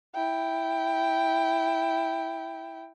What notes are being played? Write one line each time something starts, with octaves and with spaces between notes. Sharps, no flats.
E4 G5